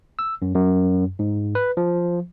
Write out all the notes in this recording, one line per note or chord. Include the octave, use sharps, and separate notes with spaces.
E6
F#2
F#2
G#2
B4
F3